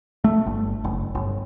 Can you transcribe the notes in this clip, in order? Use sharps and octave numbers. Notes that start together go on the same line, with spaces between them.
A3
G1
F#1
G1